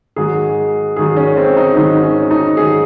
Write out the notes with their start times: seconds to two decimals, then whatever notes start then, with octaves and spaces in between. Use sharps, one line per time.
0.16 G#2 D#3 F#3 G#4
0.96 G#2 D#3 F#3 G#4
1.17 C#4
1.37 C4
1.57 D#4
1.76 G#2 D#3 F#3 D#4
2.03 C#4
2.31 D#4
2.57 G#2 D#3 F#3 G#4